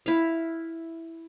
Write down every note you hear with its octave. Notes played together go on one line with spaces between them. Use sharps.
E4 F5